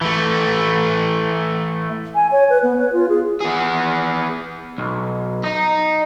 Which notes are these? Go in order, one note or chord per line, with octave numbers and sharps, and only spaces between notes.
E3 A3
G#5
C#5
B4
B3
B4
F4
G#4
B3 G#4
B1
D#5 A#5